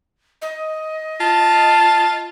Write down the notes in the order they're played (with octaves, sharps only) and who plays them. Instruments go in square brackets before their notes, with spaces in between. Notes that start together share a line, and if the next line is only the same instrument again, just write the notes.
[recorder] D#5
[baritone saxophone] F4 [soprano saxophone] A5